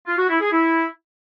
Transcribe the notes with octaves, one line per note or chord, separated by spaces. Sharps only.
F4
F#4
E4
G#4
E4